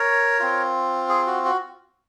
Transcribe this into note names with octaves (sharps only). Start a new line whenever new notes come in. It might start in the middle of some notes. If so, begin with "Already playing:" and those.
Already playing: A#4 C#5
C4 F4
G#4
F#4
F#4